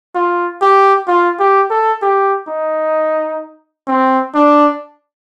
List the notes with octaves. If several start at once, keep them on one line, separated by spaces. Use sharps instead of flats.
F4
G4
F4
G4
A4
G4
D#4
C4
D4